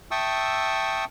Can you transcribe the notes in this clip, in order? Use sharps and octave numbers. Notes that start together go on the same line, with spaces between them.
E5 G5 A5 C#6 D#6 E6